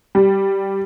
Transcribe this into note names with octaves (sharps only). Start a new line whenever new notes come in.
G3